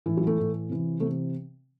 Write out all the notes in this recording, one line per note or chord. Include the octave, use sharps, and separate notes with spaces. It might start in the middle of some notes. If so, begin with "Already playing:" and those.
A2 E3
F#3
A3
A2 E3
C3 E3
C3 E3 A3